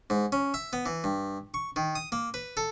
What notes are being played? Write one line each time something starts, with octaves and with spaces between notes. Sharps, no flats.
G#2
C#4
E5
B3
E3
G2
C#6
D#3
D#6
A#3
B4
A4